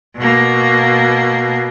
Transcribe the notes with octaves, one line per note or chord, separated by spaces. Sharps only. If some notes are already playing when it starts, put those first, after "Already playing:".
B2 A#3